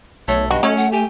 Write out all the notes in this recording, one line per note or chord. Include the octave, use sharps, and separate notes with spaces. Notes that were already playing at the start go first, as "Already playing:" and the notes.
B1 A3 C#5
G2 F#4 D#5
F#3 A3 C#4
F#5
G4 G#5